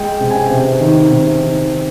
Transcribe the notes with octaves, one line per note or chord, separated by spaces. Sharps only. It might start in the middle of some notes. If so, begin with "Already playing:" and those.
Already playing: G#3 G5
C3
G#5
G5
C3
D#3
C3
D#3